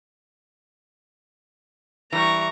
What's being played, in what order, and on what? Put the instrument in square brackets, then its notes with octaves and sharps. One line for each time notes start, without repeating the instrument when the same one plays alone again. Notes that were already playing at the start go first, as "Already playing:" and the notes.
[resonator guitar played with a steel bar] E3 G3 [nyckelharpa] A#5 C#6